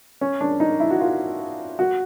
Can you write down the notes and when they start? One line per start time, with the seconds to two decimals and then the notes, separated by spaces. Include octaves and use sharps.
0.21 C#4
0.41 D4
0.60 D#4
0.80 E4
0.91 F#4
1.01 F4
1.79 F#4